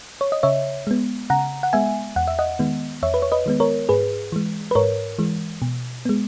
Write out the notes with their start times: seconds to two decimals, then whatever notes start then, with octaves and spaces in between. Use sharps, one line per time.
0.21 C#5
0.32 D#5
0.43 C#3 C#5 E5
0.87 G#3 B3
1.30 C#3 F#5 A#5
1.63 F#5
1.73 G#3 B3 E5 G#5
2.16 E2 F#5
2.28 E5
2.39 D#5 F#5
2.59 D#3 G#3 B3
3.03 E2 C#5 E5
3.14 B4
3.22 C#5
3.32 B4 D#5
3.46 D#3 G#3 B3
3.60 A#4 C#5
3.89 G#2 G#4 B4
4.32 E3 G#3
4.71 B4
4.75 G#2 A#4 C#5
5.19 E3 G#3
5.62 B2
6.05 G#3 B3